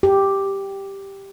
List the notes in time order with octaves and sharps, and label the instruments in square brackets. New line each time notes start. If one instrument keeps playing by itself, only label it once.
[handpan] G4